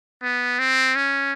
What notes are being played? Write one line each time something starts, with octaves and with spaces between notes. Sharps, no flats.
B3
C4
C#4